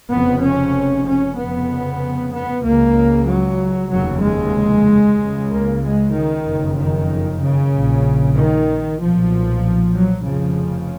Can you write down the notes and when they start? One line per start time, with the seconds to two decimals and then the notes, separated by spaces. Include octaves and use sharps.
0.11 F1 F2 C#3 B3
0.43 C#4
1.06 C#4
1.37 F1 F2 C#3 B3
2.34 B3
2.65 C#2 C#3 A#3
3.29 F#3
3.91 F1 D#2 C#3 F#3
4.23 G#3
5.19 C#2 C#3
5.49 A#3
5.82 G#3
6.14 D#3
6.46 F#1 F2 C#3
6.77 D#3
7.40 C#3
7.72 A#1 A#2
8.35 D#3
8.99 B1 A#2 F3
9.94 F#3
10.25 F1 F2 C#3 F3